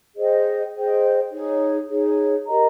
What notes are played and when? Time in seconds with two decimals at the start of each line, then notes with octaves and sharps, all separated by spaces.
0.16 G#4 C5 D#5 G5
0.75 G#4 C5 D#5 G5
1.31 D#4 G#4 C#5
1.89 D#4 G#4 C#5
2.46 G4 A#4 D#5 A#5